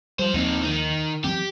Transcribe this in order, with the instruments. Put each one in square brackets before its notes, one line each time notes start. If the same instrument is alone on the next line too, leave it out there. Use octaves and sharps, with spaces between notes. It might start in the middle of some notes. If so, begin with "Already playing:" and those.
[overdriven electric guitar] F3 C5 [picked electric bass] G3
[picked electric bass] D#2 F3 A#3 [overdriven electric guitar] C4 D#4
[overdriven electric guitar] D#3 D#4
[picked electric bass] E3 F#3 C4 [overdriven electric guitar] G4